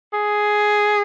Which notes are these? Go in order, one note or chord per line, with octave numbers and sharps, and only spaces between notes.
G#4